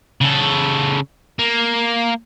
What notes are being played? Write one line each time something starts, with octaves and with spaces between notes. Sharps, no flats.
C#3 A4
A#3